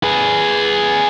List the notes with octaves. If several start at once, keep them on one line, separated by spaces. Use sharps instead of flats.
G#4 B4